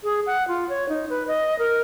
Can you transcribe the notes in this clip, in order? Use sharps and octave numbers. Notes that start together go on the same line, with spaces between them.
G#4
F#5
F4
C#5
D#4
B4
D#5
A#4